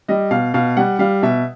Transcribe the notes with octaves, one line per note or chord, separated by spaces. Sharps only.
G3 D#5
B2 F5
B2 F5
G3 F#5
G3 F5
B2 E5